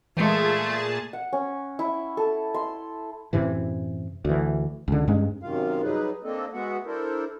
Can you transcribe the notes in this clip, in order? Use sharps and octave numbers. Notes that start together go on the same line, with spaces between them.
A#2 E3 G#3 A3 F4 G#4 A5
F#5
C#4
E4
A4
C6
F#2 A2 C3 E3
D2 E3
C#2 D3
G2 G#3 C#4
F#2 C3 D#3 F4 F5
F#3 G3 D#4 G#4 B4
A#3 C4 D4 A4 D#5
G#3 B3 F#4 E5 F#5
D4 E4 A4 A#4 C5